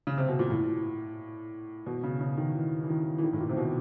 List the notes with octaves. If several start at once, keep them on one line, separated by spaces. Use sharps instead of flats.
C#3
C3
B2
A#2
A2
B2
C#3
C#3
D#3
E3
E3
D#3
E3
D#3
A2
A#2
C3
B2